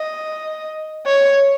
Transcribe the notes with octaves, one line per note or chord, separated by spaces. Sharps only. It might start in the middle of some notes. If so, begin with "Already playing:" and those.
Already playing: D#5
C#5